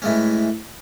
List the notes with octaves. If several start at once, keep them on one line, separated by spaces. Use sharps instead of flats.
A2 E3 G#3 C#4